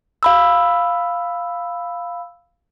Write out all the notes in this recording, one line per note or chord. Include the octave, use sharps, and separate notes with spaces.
F5 B5 E6